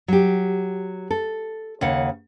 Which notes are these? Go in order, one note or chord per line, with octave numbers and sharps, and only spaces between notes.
F#3 G4
A4
D#2 C#3 F#5